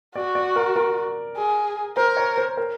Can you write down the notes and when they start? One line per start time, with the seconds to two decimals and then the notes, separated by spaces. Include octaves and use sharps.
0.16 F#4 D5
0.35 D5
0.56 A#4
0.76 A#4
1.37 G#4
1.97 A#4 C5
2.17 C#5
2.38 C5
2.57 A#4